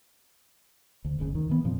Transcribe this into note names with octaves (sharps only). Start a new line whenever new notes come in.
D2
F#1 D2 C#3
D2 D#3
D#3 E3 B3
F2 A#2 F3 C4